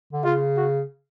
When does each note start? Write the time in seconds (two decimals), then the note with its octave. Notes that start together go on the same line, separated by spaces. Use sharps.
0.13 D3
0.24 C#3 F4
0.56 F#4